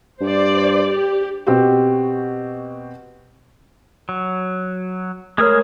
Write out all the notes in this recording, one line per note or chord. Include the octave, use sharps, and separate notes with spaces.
G2 C5 D5
G4
B2 C4 F#4 G4
F#3
G#3 A3 G#4 A#4 C#5 F6